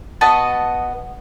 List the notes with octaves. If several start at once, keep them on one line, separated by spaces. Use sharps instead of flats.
B3 F#4 D#5 A5